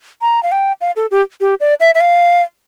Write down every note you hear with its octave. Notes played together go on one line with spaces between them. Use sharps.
A#5
F5
G5
F5
A4
G4
G4
D5
E5
E5
F5